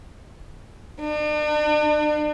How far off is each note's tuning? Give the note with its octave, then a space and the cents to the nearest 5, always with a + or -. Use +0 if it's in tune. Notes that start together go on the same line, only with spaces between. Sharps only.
D4 +40